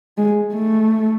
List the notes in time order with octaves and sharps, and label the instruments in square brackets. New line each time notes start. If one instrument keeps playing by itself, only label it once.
[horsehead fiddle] G#3
A3